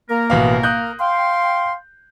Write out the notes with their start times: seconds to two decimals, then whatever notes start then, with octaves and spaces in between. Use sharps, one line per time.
0.10 A#3 A#4
0.30 A1 B2 F5
0.63 D#6 F#6 G6
1.00 F5 G5 C6